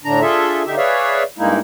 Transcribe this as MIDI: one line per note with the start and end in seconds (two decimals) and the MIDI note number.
0.04 0.21 45
0.04 0.21 50
0.04 0.21 62
0.04 0.21 82
0.21 0.63 62
0.21 0.63 65
0.21 0.63 68
0.21 0.63 69
0.21 0.63 76
0.65 0.75 50
0.65 0.75 63
0.65 0.75 67
0.65 0.75 76
0.77 1.23 68
0.77 1.23 71
0.77 1.23 73
0.77 1.23 74
0.77 1.23 76
0.77 1.23 77
1.38 1.59 43
1.38 1.59 56
1.38 1.59 58
1.38 1.59 63
1.38 1.59 64